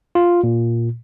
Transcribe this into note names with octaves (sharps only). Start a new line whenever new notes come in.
F4
A#2